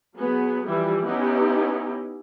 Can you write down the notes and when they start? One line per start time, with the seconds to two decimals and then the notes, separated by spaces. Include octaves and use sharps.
0.17 F#3 B3 G#4
0.65 E3 F3 G3 E4 G4
1.05 B3 C#4 D#4 E4 G4